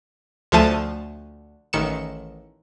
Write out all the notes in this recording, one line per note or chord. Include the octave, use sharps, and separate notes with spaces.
D2 F3 A3 A5 D#7
A1 D#3 C#7 E7